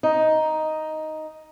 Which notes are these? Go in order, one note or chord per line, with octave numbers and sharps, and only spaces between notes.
D#4